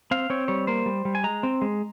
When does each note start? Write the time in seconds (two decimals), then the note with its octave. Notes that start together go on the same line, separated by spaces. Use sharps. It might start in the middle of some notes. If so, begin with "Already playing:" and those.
0.11 C4 F5
0.30 C4 C#5
0.48 G3 C#5
0.67 A#3 C5
0.86 G3
1.05 G3
1.15 G#5
1.24 G#3 A#5
1.43 C4
1.62 G#3